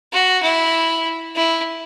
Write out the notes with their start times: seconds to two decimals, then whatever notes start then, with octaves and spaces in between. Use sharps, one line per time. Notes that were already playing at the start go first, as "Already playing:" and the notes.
0.12 F#4
0.42 E4
1.35 E4